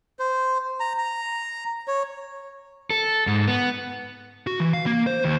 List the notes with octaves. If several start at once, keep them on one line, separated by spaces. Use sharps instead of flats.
C5
A#5
A#5
C#5
A4
G#2
B3
F#4
E3
F5
A#3
C5
D#2